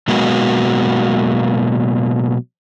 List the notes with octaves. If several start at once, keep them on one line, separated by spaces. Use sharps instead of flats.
B2 F#3 G#3 A#3 B3 F#4